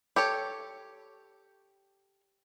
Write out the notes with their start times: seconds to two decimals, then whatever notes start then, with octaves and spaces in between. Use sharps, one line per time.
0.16 G4 A4 C#5